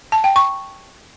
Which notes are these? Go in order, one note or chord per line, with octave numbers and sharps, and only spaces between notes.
A5
G5
C#6